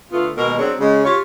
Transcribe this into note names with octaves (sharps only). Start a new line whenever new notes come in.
D3 A3 B3 F4
D#2 B2 G#3 A#4
F#3 C4 D4 G#4 C#5
C#3 G#3
F4 G4 C#5